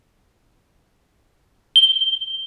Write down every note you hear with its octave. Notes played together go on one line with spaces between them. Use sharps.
G7